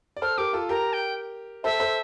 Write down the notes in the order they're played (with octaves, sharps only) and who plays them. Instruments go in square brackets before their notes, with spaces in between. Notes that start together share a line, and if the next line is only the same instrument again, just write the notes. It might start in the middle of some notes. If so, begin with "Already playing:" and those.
[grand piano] D5
[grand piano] A4 C5 [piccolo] F6
[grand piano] G4 A#4 [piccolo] D6
[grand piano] F4 A4
[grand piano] G4 A#4 [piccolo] A#5
[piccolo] G5
[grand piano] A4 C5 [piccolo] E5
[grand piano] A4 C5